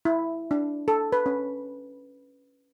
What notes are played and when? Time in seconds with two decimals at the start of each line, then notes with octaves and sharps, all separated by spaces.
0.05 E4
0.51 D4
0.88 A4
1.12 B4
1.26 C#4